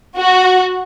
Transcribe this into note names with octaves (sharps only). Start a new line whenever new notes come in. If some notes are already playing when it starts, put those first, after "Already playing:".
F#4